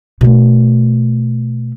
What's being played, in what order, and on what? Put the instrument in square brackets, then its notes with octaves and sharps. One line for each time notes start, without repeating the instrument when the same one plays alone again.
[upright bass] B2 A3